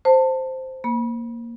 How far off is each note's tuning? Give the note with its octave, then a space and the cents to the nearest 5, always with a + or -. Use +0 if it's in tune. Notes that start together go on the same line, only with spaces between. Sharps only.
C5 +0 A5 +20
A#3 +0 B5 -30